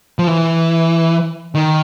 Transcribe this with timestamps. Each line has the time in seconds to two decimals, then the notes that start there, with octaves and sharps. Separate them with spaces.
0.19 F3
0.27 E3
1.55 D#3